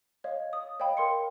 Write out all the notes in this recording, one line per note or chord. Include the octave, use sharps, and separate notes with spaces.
C#5 D#5 F5
D#6
C#5 D#5 F5 G5 B5
A#4 C6 C#7